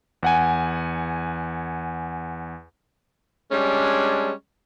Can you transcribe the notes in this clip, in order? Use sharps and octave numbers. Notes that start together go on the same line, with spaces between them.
E2 F#5 G#5
G3 G#3 C#4 D4